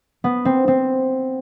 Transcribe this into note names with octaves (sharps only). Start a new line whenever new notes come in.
B3
C4
C4